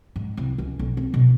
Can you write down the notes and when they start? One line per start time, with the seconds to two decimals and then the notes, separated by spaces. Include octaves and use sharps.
0.16 G#2
0.37 C2
0.58 C#2
0.79 B1
0.97 C4
1.14 B2